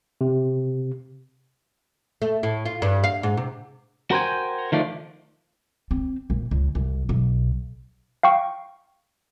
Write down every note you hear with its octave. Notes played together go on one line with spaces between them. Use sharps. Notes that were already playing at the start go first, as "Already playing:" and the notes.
C3
A3
A2
F4
G2
F5
G#2
C3
F#4 A#4 C5 G5 G#5
D#3 F3 A3 D4
C4
A#1
C#2
C2
B1
F5 G5 C#6